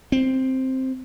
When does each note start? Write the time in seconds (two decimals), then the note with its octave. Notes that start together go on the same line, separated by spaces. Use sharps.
0.12 C4